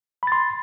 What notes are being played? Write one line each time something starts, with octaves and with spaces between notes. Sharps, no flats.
B5 C6 A6